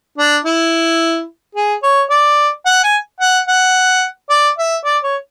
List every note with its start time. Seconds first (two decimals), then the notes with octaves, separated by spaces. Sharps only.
0.18 D4
0.45 E4
1.55 G#4
1.83 C#5
2.10 D5
2.65 F#5
2.83 G#5
3.20 F#5
3.48 F#5
4.30 D5
4.58 E5
4.85 D5
5.03 C#5